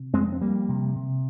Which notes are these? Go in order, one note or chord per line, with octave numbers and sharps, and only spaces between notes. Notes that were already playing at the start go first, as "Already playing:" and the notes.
Already playing: C3
F2 G#3 C4
C4
F2 G3 A#3
C3
C3